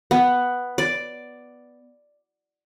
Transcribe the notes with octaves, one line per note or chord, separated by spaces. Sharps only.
B3
D5